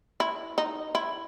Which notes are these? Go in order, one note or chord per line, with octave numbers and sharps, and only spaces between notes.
E4
D#4
E4